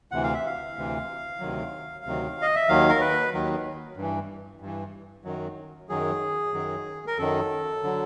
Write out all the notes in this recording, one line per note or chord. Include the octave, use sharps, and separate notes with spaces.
D2 C3 E3 F#5
F5
E5
F5
D2 C3 E3
D2 C3 D#3 F#3
D2 C3 D#3 F#3
D#5
E5
D#2 D#3 F#3 F5
A#4
B4
D#2 D#3 F#3
G2 E3
G2 E3
F#2 D#3 F#3
F#2 D#3 F#3 G#4
F#2 D#3 F#3
A#4
F#2 D#3 F#3 A4
D3 F#3